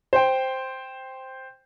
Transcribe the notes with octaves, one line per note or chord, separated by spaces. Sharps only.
C5 G5